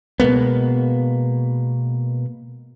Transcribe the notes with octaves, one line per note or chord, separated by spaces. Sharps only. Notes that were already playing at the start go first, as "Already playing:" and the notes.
B2 G#3 A#3 B3